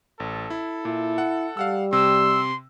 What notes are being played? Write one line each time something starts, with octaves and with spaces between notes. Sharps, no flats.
A1 A4
E4
A#2 E4
F#5
G3 F5 F#5 E6
C3 C6 E6